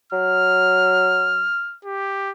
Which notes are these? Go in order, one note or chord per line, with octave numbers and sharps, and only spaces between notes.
F#3 F6
G4